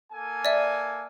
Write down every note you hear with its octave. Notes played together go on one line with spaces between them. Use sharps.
A#3 A4 G#5
D5 E5